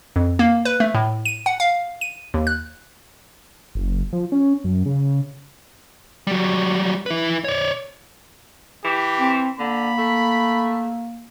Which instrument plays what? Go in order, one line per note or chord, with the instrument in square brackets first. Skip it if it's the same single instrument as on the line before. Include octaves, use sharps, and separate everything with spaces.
[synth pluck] F2
A#3
B4
A3
A2
D#7
F#5
F5
D#7
D#2
F#6
[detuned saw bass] F#1
F3
C#4
F#2
C#3
[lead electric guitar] F#3 G3
E4 B4
C#5 D5
[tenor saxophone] E3 [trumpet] G4
[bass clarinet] C4
[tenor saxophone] D3 [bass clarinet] A#3 [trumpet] B5
[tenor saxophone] A3